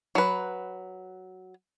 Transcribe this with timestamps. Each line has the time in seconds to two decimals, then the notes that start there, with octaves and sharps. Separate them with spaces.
0.15 F#3 B4